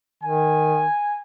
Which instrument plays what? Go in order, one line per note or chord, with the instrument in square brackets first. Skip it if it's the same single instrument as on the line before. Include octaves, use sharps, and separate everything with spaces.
[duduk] D#3 [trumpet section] G#5